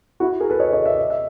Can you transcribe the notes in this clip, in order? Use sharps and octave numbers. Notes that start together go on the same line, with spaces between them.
E4 F#4
G#4 A#4
A4 B4
C#5 D#5
C#5 D#5
D5 E5
D#5
E5